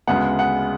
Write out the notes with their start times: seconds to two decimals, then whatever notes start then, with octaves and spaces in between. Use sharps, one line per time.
0.07 D2 C#3 G#3 B3 F#5
0.39 F#5